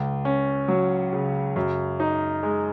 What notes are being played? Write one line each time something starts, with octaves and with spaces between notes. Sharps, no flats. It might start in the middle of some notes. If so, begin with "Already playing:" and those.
Already playing: C#2
C#4
F#3
C#3
F#2
D#4
G#3